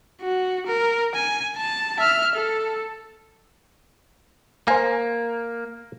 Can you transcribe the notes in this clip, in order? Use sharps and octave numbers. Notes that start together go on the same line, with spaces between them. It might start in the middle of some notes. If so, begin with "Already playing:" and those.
F#4
A#4
G#5
A5
E5 F6
A4
A#3 C5 G#5